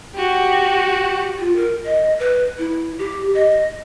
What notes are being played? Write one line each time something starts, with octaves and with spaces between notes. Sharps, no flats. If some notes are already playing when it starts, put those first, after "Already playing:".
F#4 G4
F4
A#4
D#5
B4
E4
G4
D#5